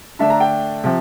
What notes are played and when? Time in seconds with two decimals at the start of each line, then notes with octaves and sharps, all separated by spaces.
0.19 D3 A3 D4 E5
0.30 A#5
0.40 G5
0.84 C3 F3